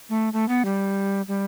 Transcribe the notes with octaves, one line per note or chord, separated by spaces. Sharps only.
A3
A3
B3
G3
G3